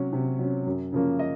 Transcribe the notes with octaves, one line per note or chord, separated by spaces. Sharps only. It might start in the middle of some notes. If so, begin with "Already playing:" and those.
Already playing: C3 F#3 C#4
C3
F#3 C#4
F#2
C#3 F3 A#3 C#4
D#5